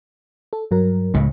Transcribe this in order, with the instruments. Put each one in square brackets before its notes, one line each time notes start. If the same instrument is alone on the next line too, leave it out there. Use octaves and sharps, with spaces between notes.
[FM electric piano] A4
G2 F#3 A#4
[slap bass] C#2 A2